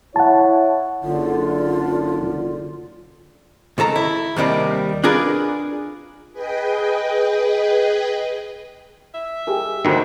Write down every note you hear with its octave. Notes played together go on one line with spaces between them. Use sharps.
E4 C#5 F#5 A5
F#1 D3 F4
C#2 D#3 A4 A#5
E4
D#2 C3 D#3 G3 C4
D4 F4 G#4 A#4 B4
G#4 B4 D#5 G5
E5
G4 G#4 A#4
D2 D#3 D#4 F#4 C5